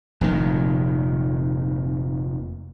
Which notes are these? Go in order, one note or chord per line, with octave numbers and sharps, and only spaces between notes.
F1 A#2 D#3